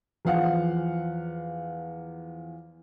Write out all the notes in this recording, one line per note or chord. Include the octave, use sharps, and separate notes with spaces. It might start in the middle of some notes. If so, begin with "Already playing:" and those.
E2 F3 F5 F#5